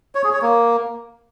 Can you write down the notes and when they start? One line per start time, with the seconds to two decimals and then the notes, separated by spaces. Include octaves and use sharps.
0.15 C#5
0.24 G#4
0.33 C#5
0.42 A#3